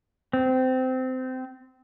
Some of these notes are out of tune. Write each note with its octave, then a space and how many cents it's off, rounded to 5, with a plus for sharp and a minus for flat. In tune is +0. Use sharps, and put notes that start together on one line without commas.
C4 -20